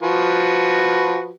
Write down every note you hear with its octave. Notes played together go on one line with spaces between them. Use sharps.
F3 F#4 B4